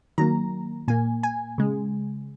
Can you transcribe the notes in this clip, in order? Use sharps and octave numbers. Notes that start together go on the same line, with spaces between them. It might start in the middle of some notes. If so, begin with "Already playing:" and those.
D#3 F#3 A#3 A#5
A#2 A#3 G#5
G#5
C#3 G#3